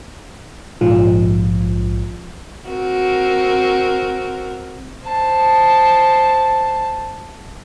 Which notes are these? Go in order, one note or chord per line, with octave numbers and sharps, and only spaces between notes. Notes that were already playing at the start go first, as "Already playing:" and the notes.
A#1 G#2 F3
C4 F#4 A#4
C5 A5